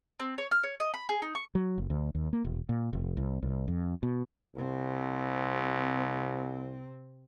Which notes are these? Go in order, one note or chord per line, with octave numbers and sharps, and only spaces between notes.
C4
C#5
F6
C#5
D#5
B5
G#4
D#4
C#6
F#3
F#1
D2
D#2
A#3
E1
A#2
F1
C2
C2
F2
B2
C2 C3 C4